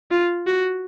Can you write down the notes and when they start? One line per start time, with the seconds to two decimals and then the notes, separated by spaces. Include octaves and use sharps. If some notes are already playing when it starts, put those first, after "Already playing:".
0.11 F4
0.47 F#4